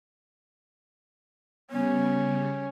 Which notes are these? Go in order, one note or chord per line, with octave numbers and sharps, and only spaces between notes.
C#3 G3 B3 C#4